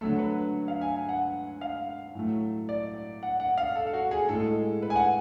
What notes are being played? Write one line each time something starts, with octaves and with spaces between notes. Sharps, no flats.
D3 F#3 A3 A4
B4
F5
G#5
G#5
F#5
F5
A2 F#3 A3
D5
F#5
F#5
F5
A4
F#4
G#4
A2 G#3 A4
B4
G#5
F#5